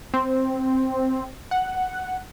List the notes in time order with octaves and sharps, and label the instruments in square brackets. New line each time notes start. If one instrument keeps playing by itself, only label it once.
[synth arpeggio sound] C4
F#5